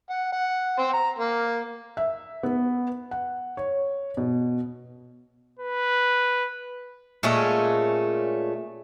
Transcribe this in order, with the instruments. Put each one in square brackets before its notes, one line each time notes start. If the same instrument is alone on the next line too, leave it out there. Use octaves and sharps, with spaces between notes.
[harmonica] F#5
F#5
C5 G5
A#5
A#3
[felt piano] E5
B3
F#5
C#5
B2
[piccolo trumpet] B4
[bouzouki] A#2 G#3 A3 C#4